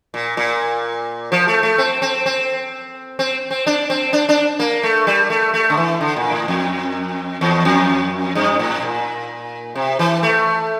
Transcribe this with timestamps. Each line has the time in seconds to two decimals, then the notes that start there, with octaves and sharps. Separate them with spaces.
0.14 A#2
0.37 A#2
1.32 F3
1.48 A3
1.63 A3
1.78 C4
2.02 C4
2.26 C4
3.19 C4
3.51 C4
3.67 D4
3.90 C4
4.13 D4
4.29 D4
4.59 A#3
4.83 A3
5.07 G3
5.30 A3
5.54 A3
5.70 D3
5.77 E3
6.01 D3
6.16 A#2
6.31 A2
6.48 F2
7.41 E2
7.65 F2
8.35 G2
8.59 A2
8.82 A#2
9.75 C3
9.99 E3
10.23 A3